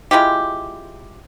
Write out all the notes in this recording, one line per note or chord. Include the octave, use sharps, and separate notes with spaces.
G#3 E4 F4 G4